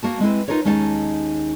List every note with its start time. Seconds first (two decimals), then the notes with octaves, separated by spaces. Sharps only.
0.03 A#3 F#4 A5
0.20 G#3 C4 E4 B4
0.48 D#4 F4 A#4 B4 C#5
0.65 D#2 G#3 C#4 D#4 F#5 A5